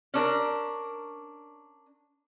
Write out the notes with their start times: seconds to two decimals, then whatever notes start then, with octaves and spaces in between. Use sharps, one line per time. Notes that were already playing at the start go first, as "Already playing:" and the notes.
0.14 C#4 D4 A#4